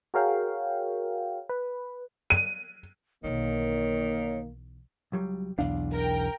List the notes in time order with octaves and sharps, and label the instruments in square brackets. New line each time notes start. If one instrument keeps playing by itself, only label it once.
[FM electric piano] F#4 G#4 A#4 C#5 F5 G5
B4
[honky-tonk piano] D#7
[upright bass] B1 E3 [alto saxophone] D#3 [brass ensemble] A#3 [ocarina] C#5
[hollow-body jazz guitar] C#2 F#3 G3
[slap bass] B1 E2 D4 [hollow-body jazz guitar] F5
[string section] A#4 G5